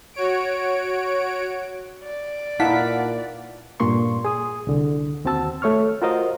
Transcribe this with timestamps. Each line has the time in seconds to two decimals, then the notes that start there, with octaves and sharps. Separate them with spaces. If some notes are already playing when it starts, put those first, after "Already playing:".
0.14 F#4 C#5 D7
2.04 D5
2.60 A#2 D#4 E4 F5 F#5 A5 B6
3.80 G2 A#2 A#3 C6 C#6
4.25 G#4 D#6
4.67 C2 D3
5.25 D#2 C4 F#4 A5 E6
5.62 A3 C#5 C#6 F6
6.02 F4 F#4 A#4 C5 D#5 F5